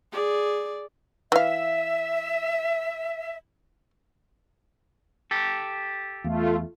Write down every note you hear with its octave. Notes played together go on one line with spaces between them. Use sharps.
G#4 D5
E3 E5 F5
G4 A4
E2 A3 F4